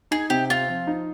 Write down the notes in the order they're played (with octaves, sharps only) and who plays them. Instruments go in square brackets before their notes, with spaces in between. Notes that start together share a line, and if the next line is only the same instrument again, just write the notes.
[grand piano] D#4 [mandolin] G#4
[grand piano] C3 [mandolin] G4
[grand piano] C4 [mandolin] F4
[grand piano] F3
D#4